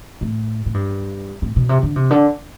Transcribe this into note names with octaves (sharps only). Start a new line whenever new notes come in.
A2
A2
G2
A2
B2
C3
D3
C3
D3